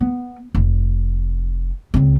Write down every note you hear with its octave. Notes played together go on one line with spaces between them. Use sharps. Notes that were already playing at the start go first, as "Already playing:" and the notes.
B3
F1
C#2 C4